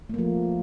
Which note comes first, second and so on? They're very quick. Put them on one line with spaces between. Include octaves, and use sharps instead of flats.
A3 A#3 F3